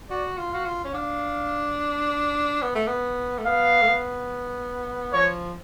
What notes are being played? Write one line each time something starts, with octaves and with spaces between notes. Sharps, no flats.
F#4 D5
F4
F#4 F5
F4
C#4
D4 F5
B3
A3
B3
A3
B3 F5
A3
B3
F3 C#5